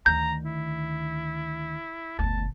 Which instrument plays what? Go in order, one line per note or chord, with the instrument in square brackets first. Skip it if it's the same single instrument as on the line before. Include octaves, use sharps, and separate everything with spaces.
[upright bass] D2 D#3 [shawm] A#5 [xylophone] G6
[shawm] E4
[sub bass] F#1 [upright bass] D2 B2 [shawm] A5